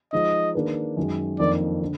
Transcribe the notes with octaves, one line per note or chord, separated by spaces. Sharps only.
F3 G#3 D#4 D#5
D#3 A#3 D4 G#4 B4
F#2 D#3 G#3
F2 D#3 A#3 D4 D5
D3